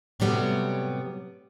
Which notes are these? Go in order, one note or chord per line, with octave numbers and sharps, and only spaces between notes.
A2 C3 F#3 G3 B3